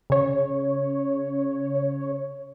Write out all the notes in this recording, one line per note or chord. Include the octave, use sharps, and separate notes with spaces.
C#3 C#5